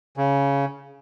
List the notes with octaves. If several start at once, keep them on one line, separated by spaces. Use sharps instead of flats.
C#3